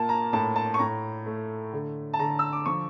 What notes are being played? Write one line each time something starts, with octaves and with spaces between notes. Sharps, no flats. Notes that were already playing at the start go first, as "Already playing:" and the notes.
Already playing: A#2 A#3 A5
A#5
A2 A5
A5
C#6
A2 A#5
A3
D3
A5
D3 A#5
E6
D6
F3 C#6